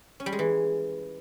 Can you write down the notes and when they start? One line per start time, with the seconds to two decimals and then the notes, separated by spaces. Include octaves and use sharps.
0.20 C#4
0.26 G3
0.32 G#3
0.39 E3